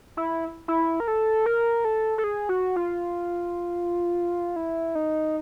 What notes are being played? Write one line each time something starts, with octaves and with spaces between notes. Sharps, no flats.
E4
E4
A#4
A4
A#4
A4
A4
G#4
F#4
F4
E4
D#4